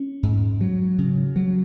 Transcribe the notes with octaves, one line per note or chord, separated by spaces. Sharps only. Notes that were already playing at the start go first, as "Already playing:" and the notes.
Already playing: C#4
G#2
F#3
C#3
F#3